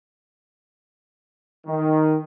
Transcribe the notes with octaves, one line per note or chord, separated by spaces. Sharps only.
D#3